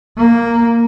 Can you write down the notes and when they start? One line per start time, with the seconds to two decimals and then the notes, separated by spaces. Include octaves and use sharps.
0.17 A#3